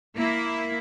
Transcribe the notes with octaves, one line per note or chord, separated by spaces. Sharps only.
A#3 E4